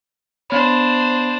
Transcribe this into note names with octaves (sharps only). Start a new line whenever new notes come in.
B3 D4 C5 B5